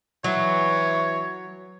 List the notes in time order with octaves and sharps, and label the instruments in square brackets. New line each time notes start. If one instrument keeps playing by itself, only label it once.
[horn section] E3 [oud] F#3 [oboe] C#5